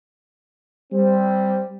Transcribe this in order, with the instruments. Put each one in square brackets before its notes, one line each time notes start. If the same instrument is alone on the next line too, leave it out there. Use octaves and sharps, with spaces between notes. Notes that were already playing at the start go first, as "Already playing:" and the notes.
[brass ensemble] G3 C4